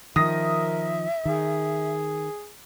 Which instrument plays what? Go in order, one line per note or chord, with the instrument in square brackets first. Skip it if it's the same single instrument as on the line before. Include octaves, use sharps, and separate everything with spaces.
[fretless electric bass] D#3 F3 [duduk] A#4 [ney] E5 [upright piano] D#6 A#6
[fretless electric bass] D#3 [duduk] G#4